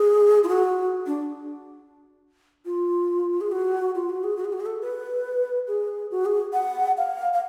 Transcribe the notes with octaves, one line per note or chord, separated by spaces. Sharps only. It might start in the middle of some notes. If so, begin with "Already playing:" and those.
Already playing: G#4
F4
F#4
D4
F4
G#4
F#4
F4
F#4
G#4
F#4
G#4
F#4
G#4
A4
B4
G#4
F#4
G#4
F#5
F5
F5